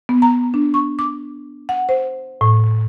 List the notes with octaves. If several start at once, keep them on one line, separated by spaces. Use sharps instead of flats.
B3
A#5
D4
C#6
D6
F#5
C5
A2